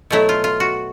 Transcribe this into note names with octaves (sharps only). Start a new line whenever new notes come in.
B2 F#3 A3 E4
F4
F4
F#4